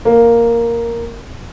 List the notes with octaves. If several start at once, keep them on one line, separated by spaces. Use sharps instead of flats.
A#3